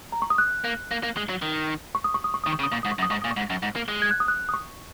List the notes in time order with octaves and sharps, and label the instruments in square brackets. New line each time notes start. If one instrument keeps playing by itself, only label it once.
[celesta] A#5
C#6
D#6
F#6
[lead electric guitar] A#3
A#3
A#3
G#3
F#3
D#3
[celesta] C#6
D#6
C#6
D#6
C#6
[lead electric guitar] D#3 [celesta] D#6
[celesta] C#6
[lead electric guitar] C#3
[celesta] D#6
[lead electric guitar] A#2 [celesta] C#6
[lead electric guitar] G#2 [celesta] D#6
[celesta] C#6
[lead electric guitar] F#2
[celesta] D#6
[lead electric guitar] G#2 [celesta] C#6
[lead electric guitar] A#2 [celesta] D#6
[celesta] C#6
[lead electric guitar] G#2
F#2
G#2
A#3
G#3
[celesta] G#6
F#6
D#6
F#6
D#6
C#6